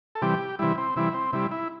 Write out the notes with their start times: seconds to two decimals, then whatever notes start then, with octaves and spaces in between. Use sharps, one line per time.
0.15 A4
0.22 C3 E3 G3 G4
0.59 C3 E3 G3 E4
0.78 C4
0.96 C3 E3 G3 E4
1.14 C4
1.33 C3 G3 E4
1.51 E4